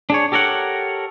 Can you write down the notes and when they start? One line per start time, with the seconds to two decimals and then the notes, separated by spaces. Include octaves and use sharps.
0.10 D4 G#4 C#5
0.32 G4 A4 A#4 C#5 F#5